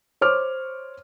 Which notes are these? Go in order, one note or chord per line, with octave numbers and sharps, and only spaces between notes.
C5 C#5 D6 F6